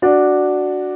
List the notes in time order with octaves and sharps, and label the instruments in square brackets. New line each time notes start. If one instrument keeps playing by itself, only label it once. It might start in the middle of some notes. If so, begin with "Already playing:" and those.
[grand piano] D4 F#4